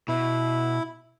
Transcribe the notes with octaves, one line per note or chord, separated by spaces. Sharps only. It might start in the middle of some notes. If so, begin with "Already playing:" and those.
B2 E4